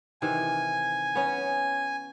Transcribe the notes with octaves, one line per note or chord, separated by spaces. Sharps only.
C3 D#3 E3 G#5
B3 C#4